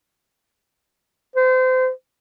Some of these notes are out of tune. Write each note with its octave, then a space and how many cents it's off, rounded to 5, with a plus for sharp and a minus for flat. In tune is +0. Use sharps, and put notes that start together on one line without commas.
C5 -30